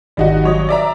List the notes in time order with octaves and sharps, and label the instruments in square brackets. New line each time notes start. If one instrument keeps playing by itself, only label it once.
[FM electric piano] G#1 D#3 D5 [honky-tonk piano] G3 D#4 F#4
[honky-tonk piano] F#3 C#5 D#5
D5 E5 A#5